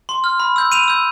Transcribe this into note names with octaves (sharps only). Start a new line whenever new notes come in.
C6
F6
B5
E6 G6
B5 D#7 F7
E6 G6